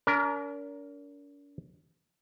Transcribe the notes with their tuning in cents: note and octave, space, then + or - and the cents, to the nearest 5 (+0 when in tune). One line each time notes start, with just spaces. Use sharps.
D4 -45 A#4 +0